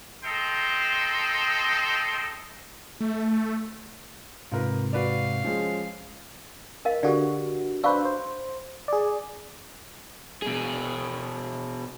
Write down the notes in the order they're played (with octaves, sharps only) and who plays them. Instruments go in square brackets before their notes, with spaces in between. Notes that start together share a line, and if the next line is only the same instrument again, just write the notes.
[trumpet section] A4 D#5 G5 A#5 C6
[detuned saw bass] A3
[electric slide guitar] G#2 C3 [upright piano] F4 A#4 B4
[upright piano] F#4 B4 D5 [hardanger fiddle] F5
[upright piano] F3 G#3 C#4
[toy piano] A#4 D#5 F5
[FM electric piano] D3 F#4 [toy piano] G4 A4 D5
[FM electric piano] D4 B4 C5 [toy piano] F5 C#6 E6
[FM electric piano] C5
G#4 D5
[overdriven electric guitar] B2 G#4